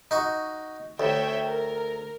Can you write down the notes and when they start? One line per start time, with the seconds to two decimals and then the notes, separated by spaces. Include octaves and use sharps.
0.11 D#4 F#4 C#6
1.00 D2 C#5 E5 G5
1.45 A#4